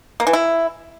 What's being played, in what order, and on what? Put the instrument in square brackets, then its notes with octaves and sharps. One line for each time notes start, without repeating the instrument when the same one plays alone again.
[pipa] A#3
E3
E4